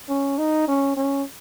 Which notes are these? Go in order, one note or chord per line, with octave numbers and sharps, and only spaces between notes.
C#4
D#4
C#4
C#4